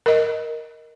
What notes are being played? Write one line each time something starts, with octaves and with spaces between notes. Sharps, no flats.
A#4 D#5